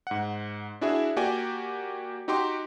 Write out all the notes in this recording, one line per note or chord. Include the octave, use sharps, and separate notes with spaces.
G#2 F#5
D4 E4 F#4 G#4 E5
A#3 F#4 G4 D5 G5 G#5
D#4 F#4 G4 G5 C6 D6